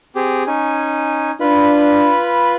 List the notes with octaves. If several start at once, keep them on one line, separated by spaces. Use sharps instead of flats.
C4 G4 G#4
C#4 D#4 G#5
D4 F4 B4 B5